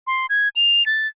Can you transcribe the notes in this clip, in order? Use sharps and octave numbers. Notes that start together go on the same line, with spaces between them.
C6
G#6
F7
A6